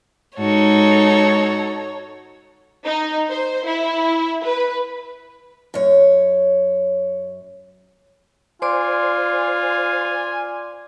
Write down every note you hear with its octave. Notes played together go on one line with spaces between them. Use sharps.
G#2 D#4 F#4 A4 C#5
D#4
C5
E4
B4
F#2 C#5
F4 C5 D5 G#5 C6 D6